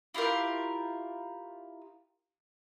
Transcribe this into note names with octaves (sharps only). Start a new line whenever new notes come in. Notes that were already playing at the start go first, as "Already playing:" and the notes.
E4 F4 G4 A#4